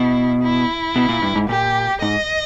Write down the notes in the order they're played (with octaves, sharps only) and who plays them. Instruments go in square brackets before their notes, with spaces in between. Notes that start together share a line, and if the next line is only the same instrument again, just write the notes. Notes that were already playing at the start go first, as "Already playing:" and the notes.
Already playing: [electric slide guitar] B2 [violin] E4
[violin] E4
[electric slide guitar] B2
A#2
G2
G#2
[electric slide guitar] A#2 [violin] G4
[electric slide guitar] G#2 [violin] D#5